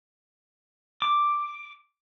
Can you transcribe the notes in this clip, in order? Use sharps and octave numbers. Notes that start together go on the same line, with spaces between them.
D6